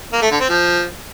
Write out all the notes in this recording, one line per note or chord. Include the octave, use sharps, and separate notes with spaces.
A#3
A3
D3
C4
F3